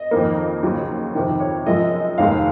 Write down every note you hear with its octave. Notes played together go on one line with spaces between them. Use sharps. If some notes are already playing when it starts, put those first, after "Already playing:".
Already playing: D#5
F2 D#3 A#3
D#2 C#3 F#3
F2 C3 D#3
C#5
F#2 F3 G#3 D#5
F1 D#2 D#3 G#3 F5